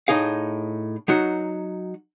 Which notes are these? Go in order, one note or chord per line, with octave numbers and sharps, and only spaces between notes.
A2 D#4 G#4 F5
F#3 D#4 F#4